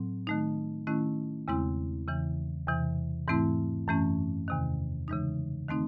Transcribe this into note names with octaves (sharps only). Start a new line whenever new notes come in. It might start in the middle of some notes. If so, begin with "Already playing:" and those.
Already playing: A2 F#3 C4
D#3 A3 D#4
D#3 A3 C#4 E4
E2 C#3 G#3 C4 E4
E2 C#3 E3
E2 C3 E3
G#2 E3 A3 C4 E4
F#2 E3 A3 C#4
E2 C3 D#3
C#3 E3 G#3 D#4
D#3 A3 C4 D#4